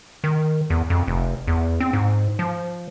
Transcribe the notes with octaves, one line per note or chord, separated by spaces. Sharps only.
D#3
E2
F2
F1
E2
C4
G#2
F3